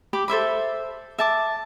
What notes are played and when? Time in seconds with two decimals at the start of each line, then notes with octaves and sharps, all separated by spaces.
0.13 G4 B5 D6
0.28 A4 C5 E5 B5
1.19 E5 A5 D6